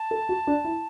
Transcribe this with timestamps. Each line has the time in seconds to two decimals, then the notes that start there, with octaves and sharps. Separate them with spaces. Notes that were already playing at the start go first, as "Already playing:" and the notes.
Already playing: A5
0.11 A4
0.29 F#4
0.47 D4
0.65 E4